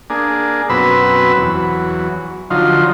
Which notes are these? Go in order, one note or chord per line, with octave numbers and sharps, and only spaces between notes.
A#3 D4 G#4
F#2 B2 C4 B4 B5 E6
E2 F#3
D3 F3 F#3 D#4 F4